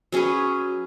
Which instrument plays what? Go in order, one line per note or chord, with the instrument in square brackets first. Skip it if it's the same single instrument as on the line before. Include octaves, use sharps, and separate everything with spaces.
[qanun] F#3 C#4 G#4 B4